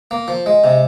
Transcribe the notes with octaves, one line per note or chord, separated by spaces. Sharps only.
A#3
F3
G#3
C3